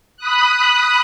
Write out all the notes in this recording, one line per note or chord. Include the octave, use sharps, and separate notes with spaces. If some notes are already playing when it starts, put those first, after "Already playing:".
B5 D#6 F#6